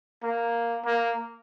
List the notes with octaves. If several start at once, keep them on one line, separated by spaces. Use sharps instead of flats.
A#3
A#3